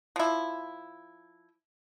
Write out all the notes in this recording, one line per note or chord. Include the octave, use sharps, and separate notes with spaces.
F3 E4